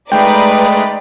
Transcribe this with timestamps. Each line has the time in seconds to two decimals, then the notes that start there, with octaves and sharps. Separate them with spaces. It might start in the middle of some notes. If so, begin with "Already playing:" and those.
0.12 G#3 A3 D#4 G#4 B4 D5 G5